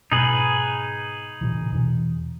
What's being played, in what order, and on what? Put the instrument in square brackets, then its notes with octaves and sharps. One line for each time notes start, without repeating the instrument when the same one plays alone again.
[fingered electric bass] G#2 B2 [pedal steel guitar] D#4 G#4 B4
[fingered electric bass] A#2 C#3 E3
E2 B2 E3